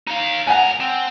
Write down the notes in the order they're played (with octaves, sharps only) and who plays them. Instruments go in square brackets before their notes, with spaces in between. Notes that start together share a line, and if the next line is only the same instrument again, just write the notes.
[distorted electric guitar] D#4 F5
[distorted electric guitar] C#2 A#5 [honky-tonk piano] F#5 G#5
[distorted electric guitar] C4